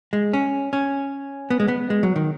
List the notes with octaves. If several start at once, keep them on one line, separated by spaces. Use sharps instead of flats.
G#3
C#4
C#4
B3
G#3
B3
G#3
F#3
D#3